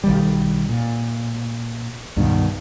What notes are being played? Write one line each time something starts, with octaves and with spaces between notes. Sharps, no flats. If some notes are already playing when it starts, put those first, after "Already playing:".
B1 D#3 G3
A#2
C#2 G2 B2 D#3